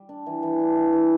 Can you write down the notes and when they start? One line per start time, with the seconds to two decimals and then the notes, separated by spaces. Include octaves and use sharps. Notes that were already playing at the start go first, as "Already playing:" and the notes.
Already playing: G3
0.09 D4
0.26 E3
0.43 E3
0.59 D4
0.76 E3
0.93 E3